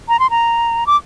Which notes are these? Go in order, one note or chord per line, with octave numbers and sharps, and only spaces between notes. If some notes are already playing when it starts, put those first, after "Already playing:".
A#5
C6
A#5
D6